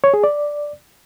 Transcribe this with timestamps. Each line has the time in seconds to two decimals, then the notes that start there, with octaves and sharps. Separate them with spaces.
0.04 C#5
0.14 G#4
0.24 D5